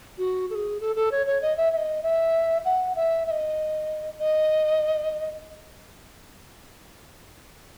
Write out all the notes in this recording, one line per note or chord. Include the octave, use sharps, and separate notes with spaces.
F#4
A4
G#4
A4
A4
C#5
C#5
D#5
E5
E5
D#5
E5
F#5
E5
E5
D#5
D#5